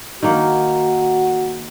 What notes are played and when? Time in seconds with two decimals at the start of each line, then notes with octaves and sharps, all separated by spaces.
0.23 D#3 A#3 F#4